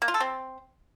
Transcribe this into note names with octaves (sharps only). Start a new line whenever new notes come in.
A#3
F4
A4
C4